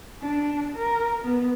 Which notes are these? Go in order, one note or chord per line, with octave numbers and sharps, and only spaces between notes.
D4
A#4
B3